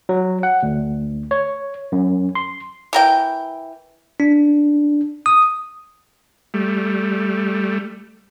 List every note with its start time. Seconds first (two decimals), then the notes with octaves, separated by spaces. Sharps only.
0.09 F#3
0.43 F#5
0.63 D2
1.31 C#5
1.92 F#2
2.35 C6
2.93 E3 A#4 G5
4.20 D4
5.26 D#6
6.54 G3 A3